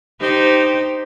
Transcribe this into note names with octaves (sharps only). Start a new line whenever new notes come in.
D#4 G4 C5